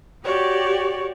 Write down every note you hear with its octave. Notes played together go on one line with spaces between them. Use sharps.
F#4 G4 C#5 D5